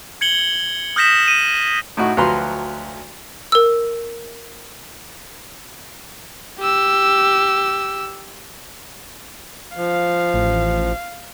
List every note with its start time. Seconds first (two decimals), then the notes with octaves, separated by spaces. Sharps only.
0.21 G#6 C#7 F#7 G7
0.96 D#6 F6 G6 A#6 B6 E7
1.28 D#7
1.97 A2 D#4 F#4
2.17 D2 F3 F#3 B4 A#5 C6
3.52 A#4 E6
6.59 G4 E6
9.76 F3 F5
10.34 A1